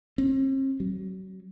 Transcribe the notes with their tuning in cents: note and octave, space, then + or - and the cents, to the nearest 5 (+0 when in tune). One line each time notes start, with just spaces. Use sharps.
C4 +45
F#3 +35